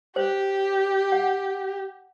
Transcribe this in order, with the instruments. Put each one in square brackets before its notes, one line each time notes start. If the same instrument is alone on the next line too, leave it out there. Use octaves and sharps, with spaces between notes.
[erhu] G4 [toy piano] C5
[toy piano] F#5